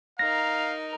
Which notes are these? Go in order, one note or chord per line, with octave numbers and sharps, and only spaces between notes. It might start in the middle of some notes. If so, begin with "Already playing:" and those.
D#4 A#4 F5 A#6